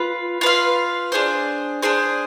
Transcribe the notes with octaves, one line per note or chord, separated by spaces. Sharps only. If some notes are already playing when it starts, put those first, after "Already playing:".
Already playing: F4 B4
F4 B4 F5
D4 G#4 C5
D4 G#4 C5